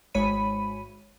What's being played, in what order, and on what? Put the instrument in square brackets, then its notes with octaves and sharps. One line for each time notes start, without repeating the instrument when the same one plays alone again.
[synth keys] G#1 G#3 C#5 B5 D#7